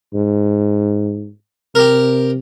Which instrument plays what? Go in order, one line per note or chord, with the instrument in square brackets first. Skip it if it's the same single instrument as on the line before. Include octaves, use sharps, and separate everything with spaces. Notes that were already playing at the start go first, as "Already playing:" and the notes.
[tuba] G#2
[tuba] C3 [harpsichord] G4 A#4